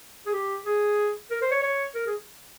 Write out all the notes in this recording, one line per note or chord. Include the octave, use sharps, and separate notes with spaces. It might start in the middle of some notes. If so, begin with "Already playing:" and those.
G#4
G4
G#4
A#4
C5
C#5
C#5
A#4
G#4